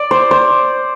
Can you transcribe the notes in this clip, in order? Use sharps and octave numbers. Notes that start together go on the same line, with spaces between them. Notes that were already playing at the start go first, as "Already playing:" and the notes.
Already playing: D5
C5
C5